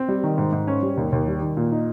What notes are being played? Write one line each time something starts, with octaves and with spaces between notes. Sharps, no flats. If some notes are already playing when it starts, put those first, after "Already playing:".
Already playing: C4
G3
D#3
G#2
G#2
C#4
G3
D#2
D#2
G3
D#3
A#2
D#4